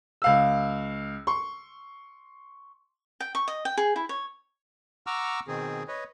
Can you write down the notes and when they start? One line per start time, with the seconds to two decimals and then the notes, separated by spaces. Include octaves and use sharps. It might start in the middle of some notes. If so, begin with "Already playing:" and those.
0.22 C#2 F5 E6
1.27 C6 C#6
3.20 G5
3.35 C#6
3.48 D#5
3.65 G5
3.77 G#4
3.96 E4
4.09 C#5
5.07 F#5 A#5 C#6 D6 E6 F6
5.48 B2 D#3 C4 G#4
5.88 B4 C#5 D#5